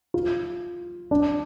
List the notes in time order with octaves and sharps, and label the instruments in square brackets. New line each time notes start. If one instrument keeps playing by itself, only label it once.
[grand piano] F4
D4